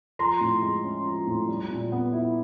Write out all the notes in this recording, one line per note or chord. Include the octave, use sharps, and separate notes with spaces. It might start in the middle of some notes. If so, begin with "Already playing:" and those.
F3 A#5 C6
A2
G#3
C#4
F3
A2
G3
A#2
B3
E4